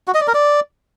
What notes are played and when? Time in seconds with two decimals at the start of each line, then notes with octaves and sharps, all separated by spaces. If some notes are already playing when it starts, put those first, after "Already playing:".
0.08 F#4
0.14 D#5
0.21 D5
0.27 A#4
0.34 D5